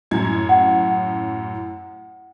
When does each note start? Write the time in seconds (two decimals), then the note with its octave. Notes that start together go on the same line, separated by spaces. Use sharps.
0.11 F#2 A2 G#6
0.49 F#5